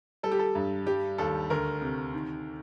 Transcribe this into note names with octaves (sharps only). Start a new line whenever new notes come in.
G3 A4
G4
A4
G2
G3 G4
D#2 A4
D2 A#4
C3
D#3